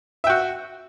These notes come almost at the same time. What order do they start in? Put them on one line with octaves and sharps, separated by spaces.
E5 G5 F#4